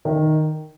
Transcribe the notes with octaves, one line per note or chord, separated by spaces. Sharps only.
D#3